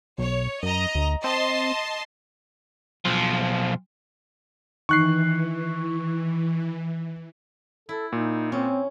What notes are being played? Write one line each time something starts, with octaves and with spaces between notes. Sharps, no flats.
B1 C#5
F#2 D#5 A#5
D2
C4 D#5 A5 C6
B1 F3
D#3 E3 C#6 F#6 C7
E4 A4
A#2 D#4
C4 C#4